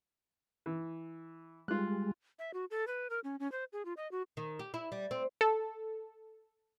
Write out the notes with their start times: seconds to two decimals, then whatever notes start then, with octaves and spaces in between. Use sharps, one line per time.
0.66 E3
1.68 G3 G#3 F4 F#6
2.39 E5
2.54 F#4
2.71 A4
2.87 B4
3.10 A#4
3.24 C#4
3.40 C#4
3.52 C5
3.73 G#4
3.85 F4
3.97 D#5
4.12 F#4
4.37 D#3
4.59 G4
4.74 E4
4.92 G3
5.11 C4
5.41 A4